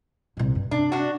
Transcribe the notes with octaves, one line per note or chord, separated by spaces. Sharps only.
C2 A#2
G2
C3 D4
D4 F#4